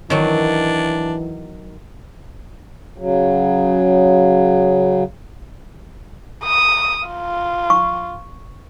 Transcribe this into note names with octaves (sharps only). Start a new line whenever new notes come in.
D#3 E3 F#3 D4
C#3 F#3
D#6
F4
C#6